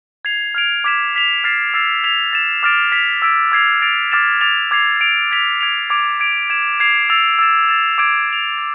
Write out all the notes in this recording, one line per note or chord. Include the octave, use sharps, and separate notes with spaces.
G#6 C7 F7
F6 G#6 D7 F7
D6 G#6 B6 E7
D6 F6 B6 F7
F6 A6 C7 E7
E6 A6 C7 E7
G#6 B6 F7
A6 E7
D6 F6 A6 D7
G#6 B6 F7
E6 G#6 B6 D7
D6 G#6 C7 F7
A6 D7 F7
D6 F6 A6 C7 E7
D6 A6 D7 F7
D6 G#6 C7 F7
G#6 D7 F7
G#6 B6 F7
G#6 D7 F7
D6 G#6 D7 F7
G#6 D7 F7
G#6 B6 E7
G#6 C7 F7
E6 A6 C7 F7
E6 A6 E7
A6 E7
D6 G#6 D7 F7
G#6 D7 F7
A6